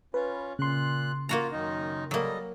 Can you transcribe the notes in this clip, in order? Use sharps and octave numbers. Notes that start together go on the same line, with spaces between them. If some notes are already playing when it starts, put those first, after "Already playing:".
C#4 F4 B4
A#2 C#3 C6 F#6
A#3 F4 F#4 A#5
F#2 D#3 D#4
F#3 G3 A#3 A4 D#5